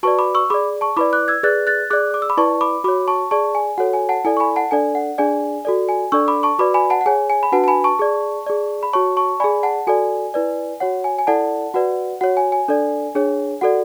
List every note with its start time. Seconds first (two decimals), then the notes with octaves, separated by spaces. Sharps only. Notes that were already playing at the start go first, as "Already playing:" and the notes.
0.03 F#4 B4 D5 A5 C#6
0.19 B5 D6
0.35 C#6 E6
0.50 G#4 D5 B5 D6
0.81 A5 C#6
0.97 E4 B4 D5 B5 D6
1.13 D6 F#6
1.28 E6 G#6
1.43 G#4 B4 D5 F#6 A6
1.67 F#6 A6
1.90 G#4 D5 D6 F#6
2.14 D6
2.22 E6
2.30 B5 D6
2.38 E4 B4 D5 A5 C#6
2.61 B5 D6
2.84 F#4 C#5 B5 D6
3.08 A5 C#6
3.31 G#4 D5 A5 C#6
3.55 G#5
3.78 F#4 A4 C#5 F#5
3.93 G#5
4.09 F#5 A5
4.25 E4 A4 D5 G#5
4.37 C#6
4.40 G#5 B5
4.56 F#5 A5
4.71 D4 A4 D5 G#5
4.95 F#5
5.18 D4 G#4 D5 G#5
5.65 F#4 A4 D5
5.89 G#5
6.12 D4 A4 D5 C#6 E6
6.28 B5 D6
6.43 A5 C#6
6.59 F#4 B4 D5 B5 D6
6.74 G#5 B5
6.90 F#5 A5
7.01 F#5
7.06 G#4 C#5 G#5
7.30 G#5
7.43 B5
7.52 D4 F#4 B4 F#5 A5
7.64 A5
7.68 G#5 B5
7.84 A5 C#6
7.99 G#4 D5
8.46 G#4 D5
8.83 B5
8.93 F#4 C#5 A5 C#6
9.17 A5 C#6
9.40 G#4 D5 G#5 B5
9.63 F#5 A5
9.87 F#4 A4 D5 G#5
10.34 E4 B4 D5
10.80 F#4 C#5 F#5
11.04 G#5
11.18 G#5
11.27 E4 A4 D5 F#5 A5
11.74 F#4 B4 D5 F#5
12.21 F#4 C#5 F#5
12.37 G#5
12.52 G#5
12.68 D4 A4 D5
13.15 D4 G#4 C#5
13.61 F#4 A4 D5 F#5